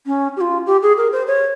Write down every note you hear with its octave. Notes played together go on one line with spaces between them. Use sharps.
C#4
G4
F4
G4
G#4
A#4
C5
C#5